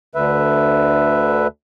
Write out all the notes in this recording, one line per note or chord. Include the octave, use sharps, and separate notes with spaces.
D2 D3 B4 E5